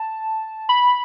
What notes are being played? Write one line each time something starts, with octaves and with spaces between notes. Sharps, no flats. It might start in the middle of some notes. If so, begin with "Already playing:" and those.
Already playing: A5
B5